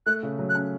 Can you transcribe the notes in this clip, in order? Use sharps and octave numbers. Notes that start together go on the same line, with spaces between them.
A3 F#6
C#3
F#3
F#6
C#4